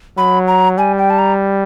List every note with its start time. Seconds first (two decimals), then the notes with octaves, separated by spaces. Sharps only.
0.17 F#3 B5
0.48 A#5
0.78 G3 G#5
0.98 G5
1.10 A5
1.19 A#5